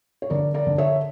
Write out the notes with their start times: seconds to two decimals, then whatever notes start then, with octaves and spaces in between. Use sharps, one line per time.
0.22 C#5
0.30 D3 A#4 D5
0.54 A#4 D5
0.67 D3
0.78 C#5 E5